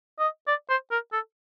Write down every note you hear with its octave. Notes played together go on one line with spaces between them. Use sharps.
D#5
D5
C5
A#4
A4